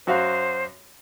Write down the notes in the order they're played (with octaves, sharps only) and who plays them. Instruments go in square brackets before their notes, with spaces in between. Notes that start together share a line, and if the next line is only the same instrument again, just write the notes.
[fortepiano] F#2 F#4 F5 [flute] C5